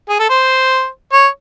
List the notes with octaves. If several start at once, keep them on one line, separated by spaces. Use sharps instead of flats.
G#4
A4
C5
C#5